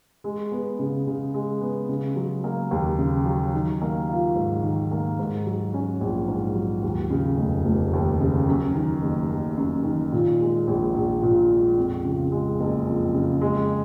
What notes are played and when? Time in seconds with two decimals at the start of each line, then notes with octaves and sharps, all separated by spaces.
0.24 G#3
0.52 B3
0.79 C#3
1.07 C#3
1.34 G#3
1.61 B3
1.89 C#3
2.16 F#3
2.44 A#3
2.71 D#2
2.99 C#3
3.26 F#3
3.54 D#3
3.82 A#3
4.09 F4
4.35 G#2
4.63 D#3
4.91 A#3
5.19 G#2
5.46 F#3
5.74 C#4
6.01 A#1
6.28 G#2
6.55 F#3
6.83 D#2
7.10 C#3
7.37 F1
7.65 F1
7.93 D#2
8.21 C#3
8.48 F#2
8.75 D#3
9.02 F#1
9.31 F#1
9.57 F#2
9.85 D#3
10.12 A#2
10.41 G#3
10.67 A#1
10.94 A#1
11.22 A#2
11.50 G#3
11.78 F2
12.04 C#3
12.32 G#3
12.60 F#1
12.87 F2
13.14 C#3
13.41 G#3